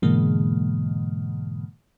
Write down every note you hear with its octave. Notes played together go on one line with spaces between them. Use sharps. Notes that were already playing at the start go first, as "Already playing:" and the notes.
G#2 B2 D3 E3 G#3 A#3